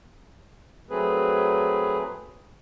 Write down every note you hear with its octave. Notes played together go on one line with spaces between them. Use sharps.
F#3 A3 C4 G#4 B4